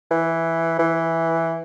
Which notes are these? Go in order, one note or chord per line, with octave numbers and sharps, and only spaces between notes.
E3
E3